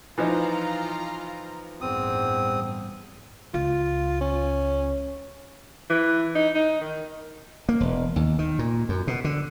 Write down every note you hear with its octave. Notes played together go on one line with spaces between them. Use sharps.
E3 F3 D#4 F4 A#5
A1 E2 G2 C4 D#6
C#2 F4
C#4
E3
D#4
D#4
D#3
A#3
E1
D#2
D#3
A#2
F#2
B2
D3